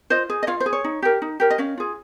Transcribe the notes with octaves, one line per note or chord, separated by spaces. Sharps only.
F4 C5 D#5
G#4
D#5
F4 C#5 F5
C5
G#4
C#5
D#4
G4 A#4
D#4
G4 A#4
D#5
C#4 C#5 F5
F4 G#4